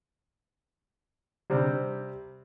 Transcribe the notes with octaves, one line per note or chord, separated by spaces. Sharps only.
C3 G3 C4